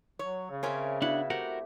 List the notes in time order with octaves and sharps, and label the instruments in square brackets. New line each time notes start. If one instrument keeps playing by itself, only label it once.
[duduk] F#3 [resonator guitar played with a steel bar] C#5
[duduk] C#3
[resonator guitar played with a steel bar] C4 C#4 A#4 [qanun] C#5 E5
[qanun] B3 F#4 [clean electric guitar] D4 F#5 [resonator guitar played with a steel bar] E4
[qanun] A3 C4 G4 [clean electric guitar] F#4 A#4 F#5